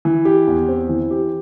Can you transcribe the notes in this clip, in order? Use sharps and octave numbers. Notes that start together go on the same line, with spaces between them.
E3
G4
E2
C4
E3
G4